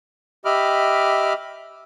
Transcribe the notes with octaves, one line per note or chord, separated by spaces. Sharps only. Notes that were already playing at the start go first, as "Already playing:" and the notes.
G4 D#5 E5 B5 D6 F6